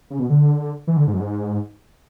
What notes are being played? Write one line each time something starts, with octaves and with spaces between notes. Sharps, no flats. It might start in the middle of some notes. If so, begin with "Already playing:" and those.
C#3
B2
D3
E3
D3
G#2
F#2
G#2